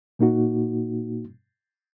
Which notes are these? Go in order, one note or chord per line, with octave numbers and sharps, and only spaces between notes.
A#2 A#3 D#4 F#4